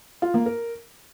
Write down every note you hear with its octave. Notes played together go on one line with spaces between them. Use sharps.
F4
A#3
A#4